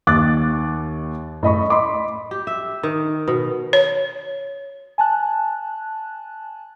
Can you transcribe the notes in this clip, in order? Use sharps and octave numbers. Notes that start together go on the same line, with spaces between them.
D#2 D6 F#6 A6
A2 D#5 B5 C#6
D#5 B5 C6 D6
G4
E5
D#3
B2
C#5
G#5 A5 F#6